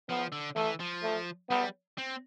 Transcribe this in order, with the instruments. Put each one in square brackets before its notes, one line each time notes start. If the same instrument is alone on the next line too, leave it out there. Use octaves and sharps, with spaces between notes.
[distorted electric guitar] F3 [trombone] B3
[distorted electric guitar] D3
[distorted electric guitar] E3 [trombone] A3
[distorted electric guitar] F3
[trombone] A3
[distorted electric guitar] G3 [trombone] B3
[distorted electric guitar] C4